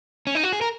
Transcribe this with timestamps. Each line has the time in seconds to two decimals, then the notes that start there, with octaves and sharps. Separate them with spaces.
0.27 C#4
0.35 D#4
0.43 F#4
0.52 G#4
0.61 A#4